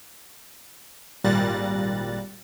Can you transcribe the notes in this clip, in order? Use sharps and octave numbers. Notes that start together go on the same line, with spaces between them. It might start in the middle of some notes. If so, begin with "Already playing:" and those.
G#1 A#2 G3 F#6 A6 A#6